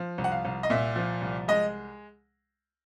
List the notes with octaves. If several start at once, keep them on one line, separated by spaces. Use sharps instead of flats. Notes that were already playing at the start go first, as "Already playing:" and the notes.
Already playing: F3
C2
F#5
F5
C2
D#5
A#2 E5
F3
C2
G#3 D#5